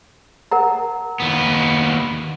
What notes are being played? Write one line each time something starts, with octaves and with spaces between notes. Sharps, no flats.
A#4 F#5 A#5
D#2 B3